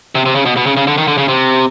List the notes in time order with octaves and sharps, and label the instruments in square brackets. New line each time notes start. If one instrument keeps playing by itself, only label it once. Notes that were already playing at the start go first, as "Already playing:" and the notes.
[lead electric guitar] C3
C3
C#3
B2
B2
C#3
C#3
D3
D#3
D3
C#3
C3